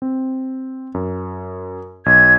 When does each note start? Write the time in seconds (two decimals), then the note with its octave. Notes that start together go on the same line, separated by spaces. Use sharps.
0.02 C4
0.94 F#2
2.06 B1 G#6